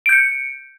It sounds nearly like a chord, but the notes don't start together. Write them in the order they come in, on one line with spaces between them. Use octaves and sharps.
D7 G6 C#7